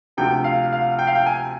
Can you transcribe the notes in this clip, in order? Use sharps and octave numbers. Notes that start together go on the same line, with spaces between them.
D2 C3 F3 G5
F5
F5
G5
F5
G5
G#5